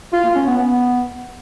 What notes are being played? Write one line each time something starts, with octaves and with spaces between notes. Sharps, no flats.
F4
A#3
C#4
B3
B3